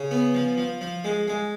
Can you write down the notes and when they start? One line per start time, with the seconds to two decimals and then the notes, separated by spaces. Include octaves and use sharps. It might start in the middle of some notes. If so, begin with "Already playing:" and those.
Already playing: C#3
0.11 B3
0.34 F3
0.58 F3
0.81 F3
1.04 G#3
1.28 G#3